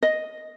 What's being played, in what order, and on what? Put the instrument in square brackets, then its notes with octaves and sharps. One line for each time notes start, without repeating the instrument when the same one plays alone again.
[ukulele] D#5